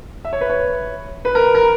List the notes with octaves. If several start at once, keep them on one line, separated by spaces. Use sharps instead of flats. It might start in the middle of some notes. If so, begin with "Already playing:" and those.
E5
C#5
B4
C#5
B4
A#4
A#4